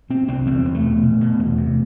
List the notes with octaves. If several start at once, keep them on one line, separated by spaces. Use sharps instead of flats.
B2 C4
C2 C4
E2 C4
E2
A3
B2
B2
B2
E2
C3